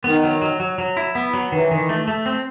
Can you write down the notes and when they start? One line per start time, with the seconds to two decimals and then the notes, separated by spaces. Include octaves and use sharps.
0.04 D#3 B3
0.24 F#3
0.42 F#3
0.60 F#3
0.78 F#3
0.97 E4
1.15 B3
1.34 F#3
1.52 D#3 E3
1.71 D#3
1.89 A3
2.08 A3
2.26 C4